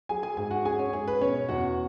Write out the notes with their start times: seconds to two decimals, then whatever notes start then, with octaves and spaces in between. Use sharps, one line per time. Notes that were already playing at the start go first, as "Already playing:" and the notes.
0.09 F#3 G#4 G#5
0.23 G#4 G#5
0.37 G#2 G#4 G#5
0.51 F#4 F#5
0.65 C#4 G#4 G#5
0.79 C#4 C#5
0.93 G#2 G#4
1.08 B4
1.21 B2 C#4 C#5
1.49 E2 F#4 F#5